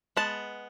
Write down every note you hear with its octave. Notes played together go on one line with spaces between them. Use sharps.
G#3 B3 A5